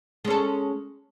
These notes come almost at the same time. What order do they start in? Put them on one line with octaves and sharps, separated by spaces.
G#3 C#4 A4